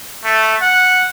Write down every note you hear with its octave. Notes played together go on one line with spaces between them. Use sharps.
A3
F#5